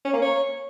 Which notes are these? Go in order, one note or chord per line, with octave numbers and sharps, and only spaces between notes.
C#4
A#3
C#5